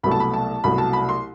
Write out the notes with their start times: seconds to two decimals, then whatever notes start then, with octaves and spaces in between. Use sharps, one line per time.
0.03 C2 B2 F#3 A3 B5
0.11 A5
0.20 B5
0.34 A5
0.64 C2 B2 F#3 A3 B5
0.78 A5
0.93 B5
1.09 C6